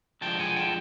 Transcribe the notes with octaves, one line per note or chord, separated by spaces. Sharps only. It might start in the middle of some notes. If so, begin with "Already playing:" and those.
D3 F3 G#3 G5 A5
F#5 G#5
G5 A5